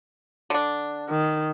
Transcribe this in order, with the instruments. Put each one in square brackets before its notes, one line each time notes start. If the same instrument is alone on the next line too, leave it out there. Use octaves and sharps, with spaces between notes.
[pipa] D3 D4
[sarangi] D#3